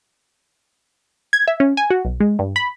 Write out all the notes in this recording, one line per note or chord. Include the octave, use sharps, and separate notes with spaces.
G#6
E5
C#4
G#5
F#4
B1
G#3
G2
B5